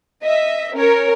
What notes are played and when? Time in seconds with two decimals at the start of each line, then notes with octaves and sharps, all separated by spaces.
0.24 D#5 E5
0.74 C#4 A#4 C#5